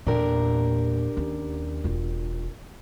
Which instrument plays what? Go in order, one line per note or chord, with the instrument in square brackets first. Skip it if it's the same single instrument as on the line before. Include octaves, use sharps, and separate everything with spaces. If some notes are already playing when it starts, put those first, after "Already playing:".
[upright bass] E2 A#2 [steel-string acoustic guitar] D4 G4 A#4
[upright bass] D#2 C#4
E1 F4